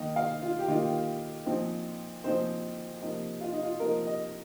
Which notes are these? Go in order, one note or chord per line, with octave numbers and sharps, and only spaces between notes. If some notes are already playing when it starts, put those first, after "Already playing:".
Already playing: D#3 A#3 D#4
F5
F4
G4
D#3 A#3 D#4 F4
A#2 F3 C4 D#4
A#2 F3 C4 D#4 C5
C3 F3 A#3 D#4
F4
D#4
F4
C3 F3 A#3 D#4 A#4
D#5